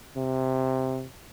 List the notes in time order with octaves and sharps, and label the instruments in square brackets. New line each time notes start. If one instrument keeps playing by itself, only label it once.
[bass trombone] C3